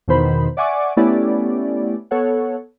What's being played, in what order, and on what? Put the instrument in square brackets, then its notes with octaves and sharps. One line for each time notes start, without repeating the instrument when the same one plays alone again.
[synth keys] E2 B2 D#3 C5 B5
D5 E5 F#5 G#5 C#6 D6
A3 B3 C#4 E4 G4 D5
B3 A4 C#5 F#5